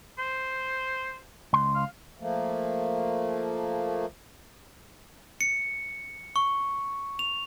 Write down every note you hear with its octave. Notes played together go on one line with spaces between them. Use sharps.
C5
C#2 C6
F5
F3 A3 A#3
C#7
C#6
F7